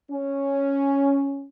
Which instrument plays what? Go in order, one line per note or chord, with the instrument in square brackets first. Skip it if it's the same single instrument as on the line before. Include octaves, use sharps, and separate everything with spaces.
[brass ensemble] C#4